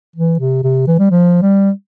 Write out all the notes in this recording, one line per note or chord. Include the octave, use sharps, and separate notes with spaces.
E3
C3
C3
E3
G3
F3
G3